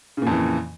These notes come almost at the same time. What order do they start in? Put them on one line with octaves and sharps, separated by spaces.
C#3 A#2 F2 E3